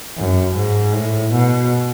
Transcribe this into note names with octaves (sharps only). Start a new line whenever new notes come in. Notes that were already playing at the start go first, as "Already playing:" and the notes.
F#2
G#2
A2
B2